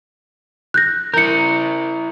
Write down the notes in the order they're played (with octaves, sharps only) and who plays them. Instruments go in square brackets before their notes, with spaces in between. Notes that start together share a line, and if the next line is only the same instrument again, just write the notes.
[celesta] F#6 G6 A#6
[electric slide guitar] E4 A#4 [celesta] G6 C#7